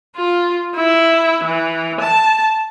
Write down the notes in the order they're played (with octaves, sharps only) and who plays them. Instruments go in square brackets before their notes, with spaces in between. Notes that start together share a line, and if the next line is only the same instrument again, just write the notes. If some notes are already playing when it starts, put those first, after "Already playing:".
[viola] F4
E4
E3
A5